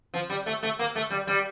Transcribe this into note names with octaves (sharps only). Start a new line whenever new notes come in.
F3
G3
A3
A3
A#3
A3
G3
G3